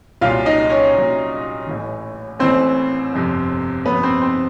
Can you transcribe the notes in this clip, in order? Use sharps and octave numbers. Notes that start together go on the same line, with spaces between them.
C2 A#2 F#3 F4 F5
D#4 D#5
C#4 C#5
C2 A#2 F#3
A1 A2 E3
A1 A2 E3 C4 C5
G1 F2 C3
G1 F2 C3 B3 B4
C4 C5
C4 C5